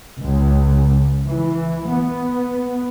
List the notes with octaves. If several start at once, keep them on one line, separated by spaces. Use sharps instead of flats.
C#2
E3
B3